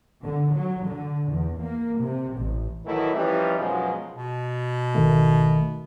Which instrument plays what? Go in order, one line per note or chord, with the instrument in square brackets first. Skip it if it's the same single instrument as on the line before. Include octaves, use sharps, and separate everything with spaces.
[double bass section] D3
F#3
D3
E2
A#3
C3
A1
[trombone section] D#3 E3 F#3 A3 D#4 E4
E3 F3 G3 C#4 D#4 G4
F#2 B2 F3 F#3 G#3
[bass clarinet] B2
[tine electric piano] G#1 D#3 A3